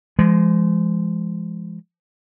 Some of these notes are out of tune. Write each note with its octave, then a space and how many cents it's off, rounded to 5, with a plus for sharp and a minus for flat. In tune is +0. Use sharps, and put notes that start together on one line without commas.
F3 -40 G#3 +0